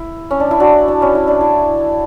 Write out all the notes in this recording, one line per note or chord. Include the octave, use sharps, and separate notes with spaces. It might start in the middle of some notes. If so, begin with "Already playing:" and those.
Already playing: E4
C#4
D4
E4
D4 F#4
D4
C#4
E4
D4
E4